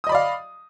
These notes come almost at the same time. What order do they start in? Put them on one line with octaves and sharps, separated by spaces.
D#6 D#5 B5 D5 F5